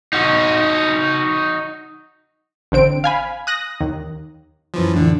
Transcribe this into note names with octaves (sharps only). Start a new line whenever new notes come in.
D#4 F#4
A1 D3 C4 D7
F5 G#5 B5
D#6 F#6 A#6
D#2
F#2 E3 F3
F2 A2 D3 E3 D4